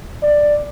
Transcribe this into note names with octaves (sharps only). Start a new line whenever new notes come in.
D5